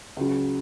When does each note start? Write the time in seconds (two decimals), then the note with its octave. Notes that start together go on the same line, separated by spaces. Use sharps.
0.17 C#2 C#3 F#3